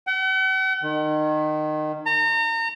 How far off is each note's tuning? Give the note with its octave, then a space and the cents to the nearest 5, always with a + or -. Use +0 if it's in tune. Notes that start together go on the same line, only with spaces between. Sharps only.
F#5 +45
D#3 -25
A#5 -35